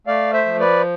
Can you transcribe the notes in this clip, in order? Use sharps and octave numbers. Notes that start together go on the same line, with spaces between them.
A3 D5 F5
C5 E5
F3
B4 D5